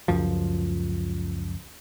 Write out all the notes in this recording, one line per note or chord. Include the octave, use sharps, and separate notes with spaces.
C#2 F#2 F3